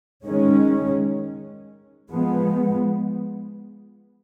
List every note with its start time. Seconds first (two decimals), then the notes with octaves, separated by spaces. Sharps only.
0.24 D#3 G#3 C#4
2.11 F3 G#3 B3